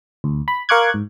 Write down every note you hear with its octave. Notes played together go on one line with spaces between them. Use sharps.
D2
B5
A#4 F5 C#6 D6 F#6 G#6
G#2